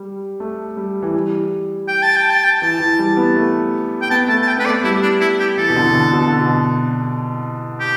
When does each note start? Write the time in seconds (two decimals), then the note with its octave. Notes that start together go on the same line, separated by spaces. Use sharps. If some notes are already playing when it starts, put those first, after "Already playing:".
Already playing: G3
0.40 A3
0.77 G3
1.02 E3
1.14 G3
1.88 G5
2.02 A5
2.16 G5
2.30 A5
2.44 G5
2.62 E3 A5
2.80 E3
2.99 G3
3.17 B3
3.36 A3
4.02 G5
4.10 B3 A5
4.28 A3 A5
4.42 A5
4.47 G5
4.57 B3 B4
4.65 A3 D5
4.84 G3 E4
5.02 D4
5.21 E4
5.40 G4
5.58 E3 A4
5.70 B2
5.76 D3
5.87 B2
5.95 D3
6.13 B2
6.27 D3
6.41 B2
7.80 G4